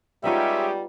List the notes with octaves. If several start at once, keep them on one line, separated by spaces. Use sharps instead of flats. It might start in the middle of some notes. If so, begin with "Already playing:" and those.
G3 G#3 B3 C#4 D#4 F4 G4 E5